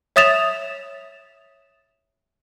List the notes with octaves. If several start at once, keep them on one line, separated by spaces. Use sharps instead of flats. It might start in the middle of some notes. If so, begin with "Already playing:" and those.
C#5 E5 D#6 A6 E7 F7